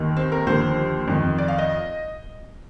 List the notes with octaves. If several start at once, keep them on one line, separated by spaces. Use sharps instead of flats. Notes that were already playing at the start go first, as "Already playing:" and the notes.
Already playing: D#2 D#3
C4
A#4
D#2 D3 F3 C5
F2 D#3
D5
F5
D#5